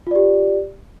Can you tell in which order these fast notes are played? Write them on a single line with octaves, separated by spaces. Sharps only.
F4 D5 G4